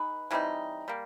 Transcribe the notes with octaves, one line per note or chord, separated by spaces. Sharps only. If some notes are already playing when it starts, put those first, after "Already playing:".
Already playing: D#4 G#4 B4
E3 G3 C4 D#4
G3 A#3